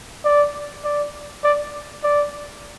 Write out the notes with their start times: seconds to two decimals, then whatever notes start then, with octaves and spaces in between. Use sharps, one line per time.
0.25 D5
0.84 D5
1.44 D5
2.04 D5